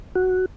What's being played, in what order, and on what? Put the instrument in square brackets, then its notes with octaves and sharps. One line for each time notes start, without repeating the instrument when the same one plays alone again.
[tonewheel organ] F#4